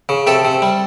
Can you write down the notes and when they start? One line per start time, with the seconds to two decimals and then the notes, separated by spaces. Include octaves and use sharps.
0.09 C#3
0.27 C3 G4 A4
0.45 C3
0.62 G3